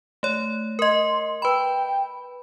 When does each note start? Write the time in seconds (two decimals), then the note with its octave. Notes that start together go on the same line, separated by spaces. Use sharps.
0.23 A3 C#5
0.79 A#4 D#5 C6
1.42 B4 G5 B5